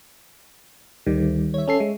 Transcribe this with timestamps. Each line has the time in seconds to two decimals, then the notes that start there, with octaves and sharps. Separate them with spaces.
1.06 D2 D#3 G3
1.54 C#5 E5
1.68 C#4 A4 C7
1.80 G#3